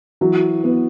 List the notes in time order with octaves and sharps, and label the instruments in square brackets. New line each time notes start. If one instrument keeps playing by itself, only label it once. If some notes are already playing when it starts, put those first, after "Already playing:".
[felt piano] E3 [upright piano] F#3
[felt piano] B3